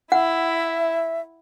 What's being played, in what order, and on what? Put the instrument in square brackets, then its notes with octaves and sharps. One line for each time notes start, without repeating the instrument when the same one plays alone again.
[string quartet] E4 [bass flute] E5 [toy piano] F#5